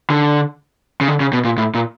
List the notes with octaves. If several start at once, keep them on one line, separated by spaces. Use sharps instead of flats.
D3
C#3
D3
C#3
B2
A#2
A2
A#2